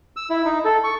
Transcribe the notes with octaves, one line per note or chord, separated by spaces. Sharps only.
E6
E4
D#4
A4
C#6